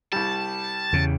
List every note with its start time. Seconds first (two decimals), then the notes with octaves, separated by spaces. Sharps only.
0.12 C2 G3 A5
0.93 E2 C#3